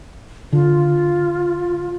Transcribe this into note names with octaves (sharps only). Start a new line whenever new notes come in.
D3 F4